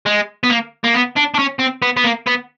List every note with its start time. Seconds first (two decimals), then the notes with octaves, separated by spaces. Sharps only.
0.06 G#3
0.44 B3
0.50 A#3
0.84 A#3
0.94 B3
1.16 D4
1.34 D4
1.39 C#4
1.60 C4
1.82 B3
1.97 B3
2.04 A#3
2.27 B3